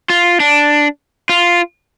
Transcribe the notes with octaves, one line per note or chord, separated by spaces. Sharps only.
F4
D4
F4